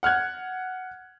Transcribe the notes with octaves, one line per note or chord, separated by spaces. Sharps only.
F#5 F6 F#6 G#6